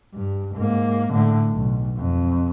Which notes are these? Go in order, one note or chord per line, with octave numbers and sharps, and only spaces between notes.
G2
G#2 A#3
A2 D3
B1
F2